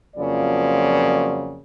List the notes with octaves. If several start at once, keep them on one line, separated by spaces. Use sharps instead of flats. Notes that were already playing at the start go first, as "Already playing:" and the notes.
F2 C#3 F3 F#3 A#3 D5